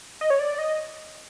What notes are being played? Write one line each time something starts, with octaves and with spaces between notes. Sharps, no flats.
D#5
C#5
D5
D#5